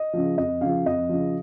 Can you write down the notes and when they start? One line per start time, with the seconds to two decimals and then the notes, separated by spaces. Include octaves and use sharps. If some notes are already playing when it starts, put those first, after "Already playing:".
Already playing: D#5
0.13 C#3 F3
0.37 F2 D#5
0.61 C#3 F3 F5
0.85 F2 D#5
1.09 C#3 F3